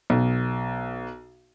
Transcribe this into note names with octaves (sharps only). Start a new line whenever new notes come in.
B1